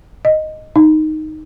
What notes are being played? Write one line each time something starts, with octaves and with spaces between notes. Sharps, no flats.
D#5
D#4